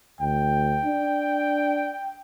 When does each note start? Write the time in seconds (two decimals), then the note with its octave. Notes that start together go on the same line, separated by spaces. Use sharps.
0.20 D2 G5
0.84 D4